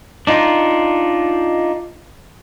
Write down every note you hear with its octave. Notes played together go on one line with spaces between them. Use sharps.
D4 D#4 F4